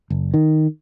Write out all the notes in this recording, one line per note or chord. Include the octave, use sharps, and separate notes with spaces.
F#1
D#3